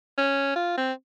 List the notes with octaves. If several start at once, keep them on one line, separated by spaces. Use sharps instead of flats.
C#4
F4
C4